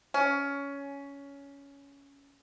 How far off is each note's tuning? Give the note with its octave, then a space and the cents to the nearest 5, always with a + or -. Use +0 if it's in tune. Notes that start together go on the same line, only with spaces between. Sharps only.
C#4 +15